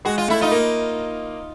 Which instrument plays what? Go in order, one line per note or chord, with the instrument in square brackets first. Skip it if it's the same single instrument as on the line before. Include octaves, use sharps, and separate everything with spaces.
[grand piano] G#3 [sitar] F#4
[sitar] F4
[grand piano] A3 [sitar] E4
[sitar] D#4 F4
[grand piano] A#3